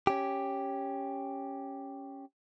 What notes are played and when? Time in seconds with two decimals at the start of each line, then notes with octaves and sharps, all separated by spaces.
0.07 C#4 G4